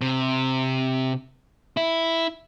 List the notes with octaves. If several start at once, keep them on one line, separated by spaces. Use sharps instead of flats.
C3
E4